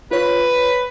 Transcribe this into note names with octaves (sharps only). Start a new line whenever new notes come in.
F4 B4 C#5